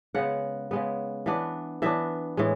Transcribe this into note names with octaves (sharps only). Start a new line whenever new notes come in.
C#3 G#3 B3 F#5
C#3 G#3 B3
E3 B3 D4
E3 B3 D4 E5
A2 E3 G#3